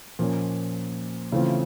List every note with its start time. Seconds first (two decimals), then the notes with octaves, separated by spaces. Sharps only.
0.19 A#2 F3 A#3 C#4
1.32 C#3 E3 A3 C4 F4